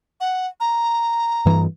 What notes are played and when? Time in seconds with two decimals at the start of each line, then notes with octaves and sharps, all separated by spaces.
0.20 F#5
0.60 A#5
1.46 G2 E3